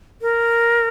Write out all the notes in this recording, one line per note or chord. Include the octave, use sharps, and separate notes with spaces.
A#4